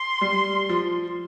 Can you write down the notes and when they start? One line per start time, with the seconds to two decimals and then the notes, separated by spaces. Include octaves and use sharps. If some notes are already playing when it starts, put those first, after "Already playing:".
Already playing: C6
0.21 G3
0.69 F3